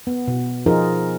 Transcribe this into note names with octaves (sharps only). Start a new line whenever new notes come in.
B3
B2
F3 D#4 F4 G#4 A#4